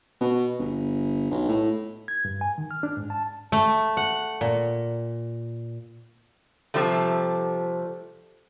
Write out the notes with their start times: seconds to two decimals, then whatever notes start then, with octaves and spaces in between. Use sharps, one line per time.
0.21 B2
0.59 G1
1.31 B1
1.49 A2
2.08 G#6
2.25 G2
2.41 G#5
2.58 D#3
2.71 F6
2.83 D4
2.97 G#2
3.10 A5
3.52 A3
3.97 F#5
4.41 A#2
6.74 C3 F3 G3 A3